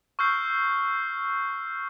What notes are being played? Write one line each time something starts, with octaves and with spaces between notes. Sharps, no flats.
C#6 E6 F6 G6 C7